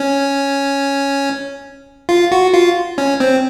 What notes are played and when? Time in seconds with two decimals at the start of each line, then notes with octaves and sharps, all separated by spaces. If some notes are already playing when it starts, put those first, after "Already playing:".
Already playing: C#4
2.09 F4
2.32 F#4
2.54 F4
2.98 C#4
3.20 C4